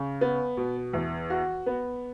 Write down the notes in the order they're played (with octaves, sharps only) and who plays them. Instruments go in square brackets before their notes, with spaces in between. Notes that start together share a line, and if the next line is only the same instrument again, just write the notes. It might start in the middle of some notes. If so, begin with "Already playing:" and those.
Already playing: [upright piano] C#3
B3
B2
E2
F#4
B3